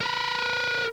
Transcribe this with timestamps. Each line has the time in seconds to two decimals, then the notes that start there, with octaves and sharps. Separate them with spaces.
0.01 A#4 B4